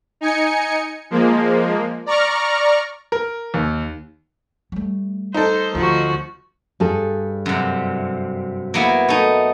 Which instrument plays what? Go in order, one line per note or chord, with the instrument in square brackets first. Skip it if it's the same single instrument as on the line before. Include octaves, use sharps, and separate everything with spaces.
[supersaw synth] D#4 G#5 C#7
F3 G#3 A#3
D5 A#5 C#6 F6
[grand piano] A#4
D#2
[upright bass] G3 A3
[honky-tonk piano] D#4 A4 [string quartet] C5
[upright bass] D2 D3 [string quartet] F3 F#4
[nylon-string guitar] G2 G#4 A4
[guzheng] F#2 C3
A#3 B3 E4
A3 D#4